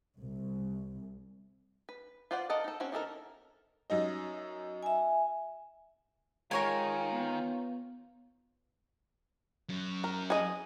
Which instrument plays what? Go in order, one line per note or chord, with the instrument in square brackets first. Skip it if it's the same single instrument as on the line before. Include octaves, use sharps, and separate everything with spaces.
[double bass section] C2
[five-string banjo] B4
F4 B4 C5 D5 F#5
A4 A#4 D#5 F#5
D#4 A4
C4 C#4 F#4 C#5
E3 D#4 A4 A#4
[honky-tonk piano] F#2 D#4 D#5
[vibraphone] E5 G#5
[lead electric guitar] D#3 [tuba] G#3 [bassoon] F4 [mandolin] A#4 C#5 G#5
[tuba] B3
[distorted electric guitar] F#3 C#4
[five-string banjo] A#4
G#4 D#5